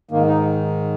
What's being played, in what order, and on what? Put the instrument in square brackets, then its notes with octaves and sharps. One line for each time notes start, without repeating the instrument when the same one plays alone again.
[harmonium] G#2 D#3 A#3
D#4